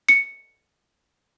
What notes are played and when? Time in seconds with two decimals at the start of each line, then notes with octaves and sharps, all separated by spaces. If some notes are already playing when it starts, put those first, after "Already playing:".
0.09 C#7